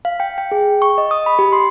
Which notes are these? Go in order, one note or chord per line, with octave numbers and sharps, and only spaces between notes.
F5
G5
G5
G#4
C#6
D#5
D#6
B5
G4
C6